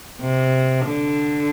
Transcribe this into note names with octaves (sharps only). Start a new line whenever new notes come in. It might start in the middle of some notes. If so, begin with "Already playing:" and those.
C3
D3